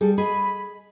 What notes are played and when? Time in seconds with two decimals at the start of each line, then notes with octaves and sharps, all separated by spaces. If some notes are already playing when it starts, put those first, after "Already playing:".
0.01 G3 G#4 A4
0.18 G#4 D#5 B5